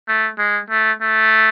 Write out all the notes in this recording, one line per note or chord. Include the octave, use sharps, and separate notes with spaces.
A3
G#3
A3
A3